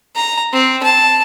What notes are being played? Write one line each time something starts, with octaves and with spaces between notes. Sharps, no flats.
A#5
C4
A5